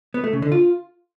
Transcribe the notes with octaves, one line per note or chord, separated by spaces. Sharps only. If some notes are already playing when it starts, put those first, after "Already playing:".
B3
A3
C#3
D3
F4